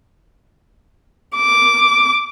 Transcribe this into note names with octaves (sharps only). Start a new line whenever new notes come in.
D6